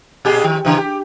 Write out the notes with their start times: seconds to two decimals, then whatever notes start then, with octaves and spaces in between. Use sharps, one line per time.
0.25 A#2 G4 G#4
0.44 D#3
0.65 C#3 E3
0.78 G4